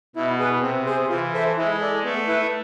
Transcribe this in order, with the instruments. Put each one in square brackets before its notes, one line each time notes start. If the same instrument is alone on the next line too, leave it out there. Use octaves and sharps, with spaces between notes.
[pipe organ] B2 [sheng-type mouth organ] E4
[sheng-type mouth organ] G#4 B4
[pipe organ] C3 [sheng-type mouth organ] C4
[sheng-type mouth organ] G#4 C5
[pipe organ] E3 [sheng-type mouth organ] F4
[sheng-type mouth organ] A4 C5 E5
[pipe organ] G#3 [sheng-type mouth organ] E4
[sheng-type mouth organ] A4 D5
[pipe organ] A3 [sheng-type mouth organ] B3
[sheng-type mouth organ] E4 B4